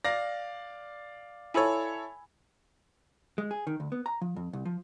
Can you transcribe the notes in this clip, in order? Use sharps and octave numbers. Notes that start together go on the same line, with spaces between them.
D5 F5 A#6
E4 A4 C#5 G#5 B5 E6
G#3
G#4
D#3
D2
B3
A#5
F3
F2
C2
F3